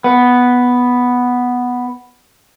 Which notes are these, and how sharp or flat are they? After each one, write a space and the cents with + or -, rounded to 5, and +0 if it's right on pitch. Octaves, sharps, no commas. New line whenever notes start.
B3 +0